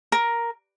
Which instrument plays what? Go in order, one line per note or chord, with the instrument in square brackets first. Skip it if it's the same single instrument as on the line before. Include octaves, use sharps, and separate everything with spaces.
[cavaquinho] A#4